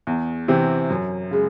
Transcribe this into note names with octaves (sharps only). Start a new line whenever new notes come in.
E2
C3 E3 C4
F#2
C#3 G#3